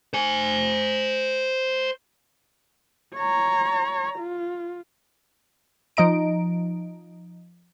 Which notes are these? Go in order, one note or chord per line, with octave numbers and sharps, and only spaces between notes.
C5 G#5
C#5 A#5
F4
F3 D#4 D#5 A#5 D7